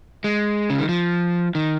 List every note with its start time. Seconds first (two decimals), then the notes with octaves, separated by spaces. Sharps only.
0.24 G#3
0.70 C#3
0.79 D#3
0.89 F3
1.55 D#3